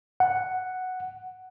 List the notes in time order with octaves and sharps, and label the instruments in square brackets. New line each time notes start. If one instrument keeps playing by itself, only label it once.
[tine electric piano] F#5